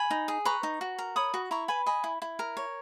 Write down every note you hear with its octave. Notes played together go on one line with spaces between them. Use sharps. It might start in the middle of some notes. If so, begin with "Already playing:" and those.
Already playing: G#5 B5
D#4
G#4
B4 A#5 C#6
D#4
F#4
A#4
C#5 B5 D#6
F#4
E4 A#5 C#6
B4 G#5 B5
D#5 G#5 B5
E4
E4
A#4
C#5